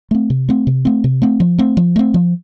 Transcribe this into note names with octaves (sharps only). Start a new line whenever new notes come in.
A3 C4
C3
A3 C4
C3
A3 C4
C3
A3 C4
F3
A3 C4
F3
A3 C4
F3